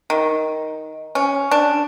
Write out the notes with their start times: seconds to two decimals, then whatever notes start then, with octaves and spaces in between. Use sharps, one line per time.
0.10 D#3
1.15 C#4
1.51 D4